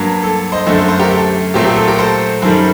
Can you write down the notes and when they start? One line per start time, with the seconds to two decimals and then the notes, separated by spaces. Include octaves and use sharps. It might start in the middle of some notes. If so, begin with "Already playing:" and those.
Already playing: G2 F#3 A#3
0.23 A4
0.52 C5 D#5
0.66 F#2 D3 A3 A4 C5
0.78 A4
0.88 A4 C5
0.99 G4 A#4
1.11 A4
1.54 A#2 F#3 A3 C4 G4
1.65 G4
1.76 A4
1.88 G4 A#4
1.98 A4 C5
2.42 F#2 D#3 G3 A4 C5